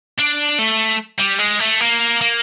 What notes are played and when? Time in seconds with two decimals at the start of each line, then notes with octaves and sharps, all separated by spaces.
0.18 D4
0.59 A3
1.20 G3
1.39 G#3
1.60 A3
1.81 A#3
2.21 A#3